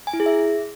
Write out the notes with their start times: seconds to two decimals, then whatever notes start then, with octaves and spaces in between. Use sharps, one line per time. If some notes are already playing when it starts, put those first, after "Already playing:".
0.07 G#5
0.13 E4
0.20 G#4
0.26 E5